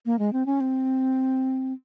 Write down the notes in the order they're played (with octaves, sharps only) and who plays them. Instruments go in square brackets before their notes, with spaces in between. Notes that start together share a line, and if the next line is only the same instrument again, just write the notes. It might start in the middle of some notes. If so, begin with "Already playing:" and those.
[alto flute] A#3
G#3
C4
C#4
C4